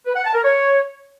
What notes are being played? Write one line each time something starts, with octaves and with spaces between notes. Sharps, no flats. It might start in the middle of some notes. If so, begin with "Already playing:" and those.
B4
F#5
A5
A#4
C#5